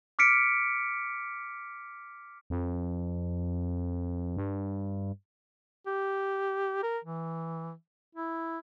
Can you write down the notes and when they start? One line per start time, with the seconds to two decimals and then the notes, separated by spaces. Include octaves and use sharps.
0.19 D6 F6 B6 C#7 D7
2.50 F2
4.37 G2
5.86 G4
6.83 A#4
7.04 E3
8.15 E4